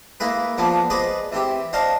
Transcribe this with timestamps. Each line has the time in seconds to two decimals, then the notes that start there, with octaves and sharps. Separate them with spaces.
0.20 A#3 E4 G#4 B4
0.58 F3 A#3 B3 D4
0.90 G#4 B4 C5 D5 D#5
1.32 E3 C4 G4
1.73 D4 D#4 C5 F5